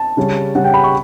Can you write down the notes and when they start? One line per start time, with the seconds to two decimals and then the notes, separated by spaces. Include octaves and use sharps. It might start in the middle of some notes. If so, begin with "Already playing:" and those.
Already playing: A5
0.17 C#3 G3 C#4
0.55 C#3 G3 C#4 F#5
0.64 G5
0.74 B5
0.84 C#6